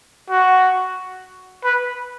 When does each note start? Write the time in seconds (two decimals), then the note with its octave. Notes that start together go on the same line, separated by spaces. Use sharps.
0.30 F#4
1.64 B4